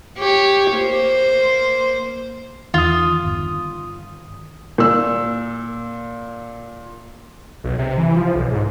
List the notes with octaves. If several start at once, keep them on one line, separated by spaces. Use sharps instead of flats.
G4 C#5
A#3 C5
E2 D#3 F4 D#6
G1
A#2 E6
B1
C3
E3
F3
B1
G#2